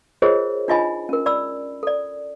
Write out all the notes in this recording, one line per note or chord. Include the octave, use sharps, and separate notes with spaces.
F4 G#4 A#4 C5 C#5 D#5
D4 D#4 F4 D#5 G#5 B5
C#4 A#4
D5 B5 E6
A4 D5